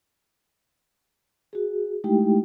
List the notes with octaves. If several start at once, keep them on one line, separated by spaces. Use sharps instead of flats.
F#4 G#4
G#3 A3 D#4 E4 G4 G5